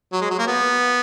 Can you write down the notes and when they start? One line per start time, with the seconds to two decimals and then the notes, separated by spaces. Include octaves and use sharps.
0.12 F#3
0.21 G#3
0.30 F#3
0.39 A#3
0.47 B3